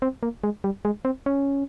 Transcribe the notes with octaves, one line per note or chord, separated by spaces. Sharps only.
C4
A#3
G#3
G3
G#3
C4
C#4